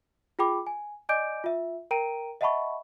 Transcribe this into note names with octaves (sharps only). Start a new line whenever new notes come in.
F4 G#4 G5 B5 D6
G#5
D5 D#5 G#5 D6 G6 D7
F4 E5
A#4 G5 A#5 D7 D#7
D#5 E5 F#5 A5 B5 C#6